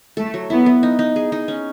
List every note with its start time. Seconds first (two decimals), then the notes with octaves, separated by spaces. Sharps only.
0.17 A3 A4
0.34 F#3
0.50 B3 E4
0.66 B3
0.83 D#4
0.99 D#4
1.16 G#4
1.32 D#4
1.48 C#4